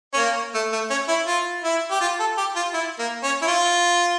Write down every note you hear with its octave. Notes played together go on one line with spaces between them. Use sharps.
C#4
A#3
A3
A3
C#4
E4
F4
E4
G4
F4
A4
G4
F4
E4
A#3
C#4
E4
F4